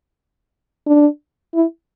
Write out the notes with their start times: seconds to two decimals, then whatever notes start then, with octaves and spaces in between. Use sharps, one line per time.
0.86 D4
1.54 E4